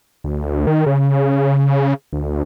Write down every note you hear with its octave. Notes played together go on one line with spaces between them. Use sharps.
D2
D#3
C#3
D2